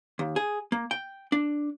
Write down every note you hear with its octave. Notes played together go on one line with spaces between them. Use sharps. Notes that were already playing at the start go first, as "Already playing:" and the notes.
D#2
G#4
A#3
G5
D4